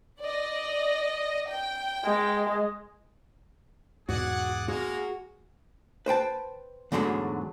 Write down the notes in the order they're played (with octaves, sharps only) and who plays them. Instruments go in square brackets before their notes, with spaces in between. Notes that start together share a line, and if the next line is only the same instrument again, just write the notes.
[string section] D5 D#5
G5
[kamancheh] G#3
[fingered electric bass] E2 G#2 B2 [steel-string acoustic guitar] F#4 [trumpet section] G#4 D5 F#5
[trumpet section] G#3 A#3 F5 [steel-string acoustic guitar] F#4 [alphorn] G#4
[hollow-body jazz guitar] B4 C5 G5 A5
E2 G#2 D3 F#3 G#3 A3